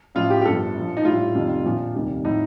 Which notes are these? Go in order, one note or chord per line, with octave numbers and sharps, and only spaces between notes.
A1 A2 F3 F4
G4
G4
G1 G2 F3 A4
A#1 A#2 F3
D#4
A#1 A2 G3 F4
F1 F2 D#3 G3
A#1 A#2 F3
F1 D#2 D#3 G3
A2 F3 D#4